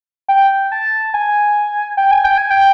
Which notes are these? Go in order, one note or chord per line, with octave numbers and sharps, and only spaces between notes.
G5
A5
G#5
G5
G#5
G5
G#5
G5